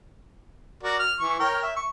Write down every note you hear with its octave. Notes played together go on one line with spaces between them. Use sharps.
F#4 A#4 D5
F6
E3 C#6
A#4 C#5 G5
E5
C#6